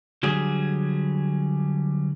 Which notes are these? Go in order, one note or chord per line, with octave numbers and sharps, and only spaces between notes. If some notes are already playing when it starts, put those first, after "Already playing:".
D3 F#3 G3 G#4